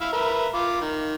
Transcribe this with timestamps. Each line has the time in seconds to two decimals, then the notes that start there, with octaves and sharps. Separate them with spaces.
0.01 E4 E5 F5
0.13 A#4 B4 E5
0.54 F4 D6
0.81 D#3